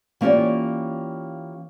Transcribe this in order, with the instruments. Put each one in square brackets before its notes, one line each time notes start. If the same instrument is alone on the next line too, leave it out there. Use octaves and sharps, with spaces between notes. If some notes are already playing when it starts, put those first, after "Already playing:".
[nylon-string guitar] E3 A#3 C#4 F4 G4 D5